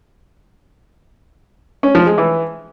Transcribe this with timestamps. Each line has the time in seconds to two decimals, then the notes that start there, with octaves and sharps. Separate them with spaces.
1.83 C#4
1.95 F3
2.06 G#3
2.18 E3